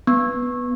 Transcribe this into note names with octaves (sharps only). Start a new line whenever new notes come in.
B3